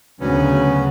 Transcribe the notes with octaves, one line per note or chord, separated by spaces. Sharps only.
D2 C#3 F#3 B3 C#4